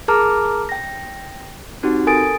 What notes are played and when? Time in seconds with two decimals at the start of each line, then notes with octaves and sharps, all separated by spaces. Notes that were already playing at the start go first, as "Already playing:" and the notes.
0.08 G#4 A#4 A5 A#5 D6 F6
0.69 G5 A#6
1.83 C4 D#4 F#4 G4
2.07 A4 A#4 G#5 D#6 A6 D7